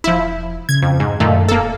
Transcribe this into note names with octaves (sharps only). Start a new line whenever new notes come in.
E1 F3 E4
C#3 G#6
F2
G#2
F#2 A#2 D#3 A3
D#1 A#3 A4